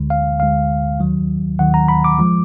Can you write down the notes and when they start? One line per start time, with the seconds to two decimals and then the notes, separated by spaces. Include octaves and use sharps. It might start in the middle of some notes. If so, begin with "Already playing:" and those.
Already playing: D2 D3 G#3
0.10 F5
0.40 D2 D3 G#3 F5
1.00 D#2 D#3 F#3
1.59 D#2 D#3 F#3 F#5
1.74 A#5
1.88 B5
2.04 D6
2.19 F3 G#3